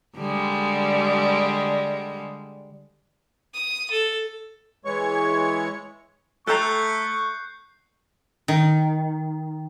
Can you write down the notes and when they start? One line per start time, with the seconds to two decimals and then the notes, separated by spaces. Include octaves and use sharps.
0.18 D3 G3 G#3
3.54 D#6
3.91 A4
4.85 E3 G#3 C#5 C#6
6.47 A3 A4 A#5 C#6 F#6 G6 C7
8.48 D#3